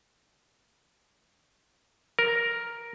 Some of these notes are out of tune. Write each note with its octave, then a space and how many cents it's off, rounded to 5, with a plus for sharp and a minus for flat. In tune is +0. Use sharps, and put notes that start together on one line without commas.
A#4 +5